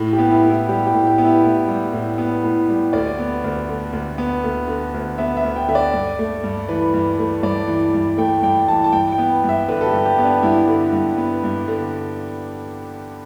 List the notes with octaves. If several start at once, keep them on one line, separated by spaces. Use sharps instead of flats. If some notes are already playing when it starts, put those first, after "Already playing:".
Already playing: A2
G4
B3
E4
A2
E4
G3 G4
G4
A2
G4
B3
E4
A2 E4
G3
A2
B3
A2
G3
D2 D5
B3
D2
D3
D2
B3
D2
D3
D2
B3 E5
E5
D2
G5
D3 E5
D5
G2
A3
G2
E3 B4
G2
A3
G2 D5
E3
G2
A3 G5
G2 G5
E3 A5
A5
G2 G5
G5
B3
G2
E5
D3 B4
A4
G4
G2
A4
G4
B3
D4
G2 E4
D3
G2
B3
G2
D3